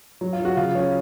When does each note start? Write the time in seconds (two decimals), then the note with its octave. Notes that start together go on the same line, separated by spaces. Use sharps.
0.21 F#3
0.33 F4
0.40 F#3
0.45 F#4
0.57 C#3 F4
0.75 F#3 C#4